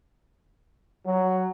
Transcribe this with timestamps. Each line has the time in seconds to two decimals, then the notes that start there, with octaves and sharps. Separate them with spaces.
1.05 F#3